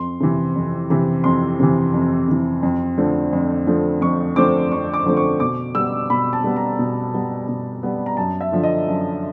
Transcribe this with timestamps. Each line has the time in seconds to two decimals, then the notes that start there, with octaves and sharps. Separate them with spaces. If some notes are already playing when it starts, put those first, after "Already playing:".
Already playing: F2 C6
0.20 C3 E3
0.56 F2
0.90 C3 E3
1.24 F2 C6
1.60 C3 E3
1.94 F2
2.28 C3 E3
2.63 F2
2.97 D3 F3 A3 C4
3.33 F2
3.67 D3 F3 A3 C4
4.01 F2 C#6
4.36 D3 F3 A3 C4 D6
4.71 F2 C#6
4.93 D6
5.05 D3 F3 A3 C4
5.17 C#6
5.40 B2 D6
5.75 G3 B3 E6
6.10 B2 B5
6.33 A5
6.44 G3 B3
6.56 A#5
6.79 B2
7.14 G3 B3
7.48 B2
7.83 G3 B3
8.06 A#5
8.17 F#2 A5
8.41 E5
8.52 D3 F3
8.63 D#5
8.87 F#2